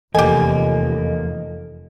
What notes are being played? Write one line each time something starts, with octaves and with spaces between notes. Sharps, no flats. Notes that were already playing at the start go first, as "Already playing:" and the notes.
F1 E2 A#3 G4 A4 D#5 G#5